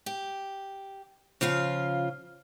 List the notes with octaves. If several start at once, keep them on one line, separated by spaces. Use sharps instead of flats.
G4
C#3 F3 F4 F5